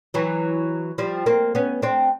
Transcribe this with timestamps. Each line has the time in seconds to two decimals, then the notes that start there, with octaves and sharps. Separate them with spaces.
0.14 E3 F#3
0.98 F3 G3
1.26 A#3 C4
1.55 B3 C#4
1.82 C4 D4